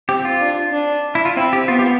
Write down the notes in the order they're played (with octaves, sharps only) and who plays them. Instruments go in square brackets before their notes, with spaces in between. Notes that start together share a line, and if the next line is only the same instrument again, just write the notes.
[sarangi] C4 [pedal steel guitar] G4
[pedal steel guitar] F4
[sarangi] D4
D4
[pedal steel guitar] E4
F4
[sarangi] C4 [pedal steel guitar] E4
[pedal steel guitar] G4
[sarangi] B3 [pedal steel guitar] F4
[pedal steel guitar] G4